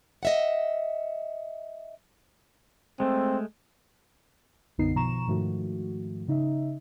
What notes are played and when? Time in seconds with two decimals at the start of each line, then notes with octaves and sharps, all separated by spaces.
0.23 D#5 E5 F#5
3.00 G#3 A3 C4
4.78 B1 F#2 D3 B3 D#4 C7
4.96 B2 F3 A#5 C#6 E7
5.28 G#2 D#3 F3 A3 F#4
6.28 C#3 D#4 D#5 E5